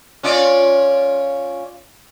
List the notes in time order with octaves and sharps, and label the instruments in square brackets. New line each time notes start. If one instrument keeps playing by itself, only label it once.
[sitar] C#4 F4 D5